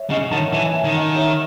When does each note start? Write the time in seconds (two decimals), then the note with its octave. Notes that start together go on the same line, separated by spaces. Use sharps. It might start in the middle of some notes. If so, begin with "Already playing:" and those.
Already playing: C#5 E5
0.10 C#3 D#5 F#5
0.31 D#3 F#5 A5
0.52 E3 E5 G#5
0.73 E5 G#5
0.84 D#3
0.94 D#5 F#5
1.15 C#5 E5